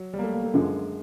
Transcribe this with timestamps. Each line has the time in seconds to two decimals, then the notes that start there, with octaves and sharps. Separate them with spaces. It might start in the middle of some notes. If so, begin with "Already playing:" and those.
Already playing: F#3
0.13 G3
0.19 A#3
0.24 A3
0.34 A#3
0.44 A3
0.53 F#2 D3 F3 G#3